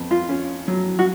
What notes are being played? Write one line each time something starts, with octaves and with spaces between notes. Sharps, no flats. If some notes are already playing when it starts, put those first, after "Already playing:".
Already playing: F2 B3
F4
C#4
F#3
F#4